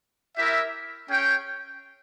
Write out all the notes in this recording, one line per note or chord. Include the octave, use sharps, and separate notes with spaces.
E4 G4 A#4 E5
C#4 G#4 C#5 G5